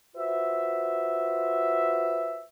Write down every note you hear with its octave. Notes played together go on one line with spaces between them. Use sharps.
F4 F#4 B4 C5 E5